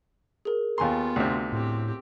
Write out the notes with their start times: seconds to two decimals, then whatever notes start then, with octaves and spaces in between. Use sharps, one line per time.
0.45 G#4 A#4
0.78 D#2 B3 F4 F5 G#5 A#5 C6
1.16 D2 C3
1.52 A2 C4 G4